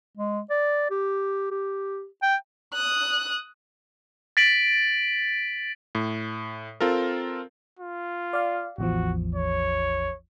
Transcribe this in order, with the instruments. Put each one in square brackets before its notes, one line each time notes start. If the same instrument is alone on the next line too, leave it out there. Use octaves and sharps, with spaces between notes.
[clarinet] G#3
D5
G4
G4
G5
[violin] D#6 F#6
[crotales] A6 B6 D7 F#7
[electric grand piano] A2
C4 F4 A4 A#4
[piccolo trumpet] F4
[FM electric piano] D5 F5
[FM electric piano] A1 E2 F3 [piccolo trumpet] F#4
[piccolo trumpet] C#5